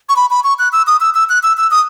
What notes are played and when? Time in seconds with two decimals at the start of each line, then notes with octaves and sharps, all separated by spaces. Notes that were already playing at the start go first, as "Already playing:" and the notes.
0.09 C#6
0.16 B5
0.30 B5
0.44 C#6
0.59 F#6
0.72 E6
0.87 D#6
1.00 E6
1.14 E6
1.29 F#6
1.43 E6
1.57 E6
1.71 D#6